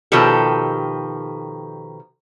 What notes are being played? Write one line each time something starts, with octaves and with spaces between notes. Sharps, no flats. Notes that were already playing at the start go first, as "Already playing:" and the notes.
B2 D#3 F3 G4 A4